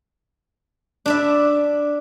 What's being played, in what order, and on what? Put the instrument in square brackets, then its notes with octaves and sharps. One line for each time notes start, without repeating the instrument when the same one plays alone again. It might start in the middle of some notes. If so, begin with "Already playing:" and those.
[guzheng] D4 D5 E5